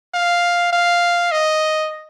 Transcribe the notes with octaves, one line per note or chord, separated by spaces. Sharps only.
F5
F5
D#5